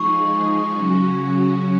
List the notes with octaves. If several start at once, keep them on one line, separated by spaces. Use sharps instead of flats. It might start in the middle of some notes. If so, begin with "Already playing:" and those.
Already playing: F3 G#3 D#4 G#4 C#6
C#3 F#3 C#4 F#4